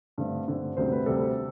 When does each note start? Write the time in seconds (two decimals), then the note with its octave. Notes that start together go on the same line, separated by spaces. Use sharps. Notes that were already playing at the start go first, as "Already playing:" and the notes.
0.18 G2 D3 A3 C4
0.48 G2 D3 A3 C4
0.77 D2 C3 G3 C4 C5
0.92 B4
1.06 D2 C3 G3 C4 A4